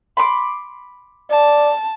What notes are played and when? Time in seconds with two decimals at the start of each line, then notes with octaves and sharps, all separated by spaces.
0.17 B5 C6 D6
1.30 D5 A5